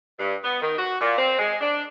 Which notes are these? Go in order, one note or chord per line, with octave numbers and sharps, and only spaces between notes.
G2
B3
D#3
F#4
A#2
C4
G#3
D4